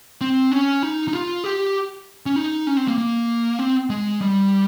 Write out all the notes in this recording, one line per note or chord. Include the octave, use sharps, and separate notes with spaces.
C4
C#4
D#4
D#4
F4
G4
C#4
D#4
C#4
C4
A#3
A#3
C4
G#3
G3